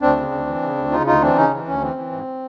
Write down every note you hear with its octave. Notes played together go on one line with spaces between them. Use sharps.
D2 C4 D4
C#3
D2
E3
C#3
D2
C#3 D#4 F4
D2 D#4 F4
E3 C4 D4
C#3 C#4 D#4
E3
D2 C#4
E3 C4
E3
G#2